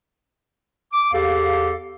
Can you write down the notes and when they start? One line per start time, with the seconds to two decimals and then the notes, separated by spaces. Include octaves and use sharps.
0.94 D6
1.13 E2 G4 A4 F5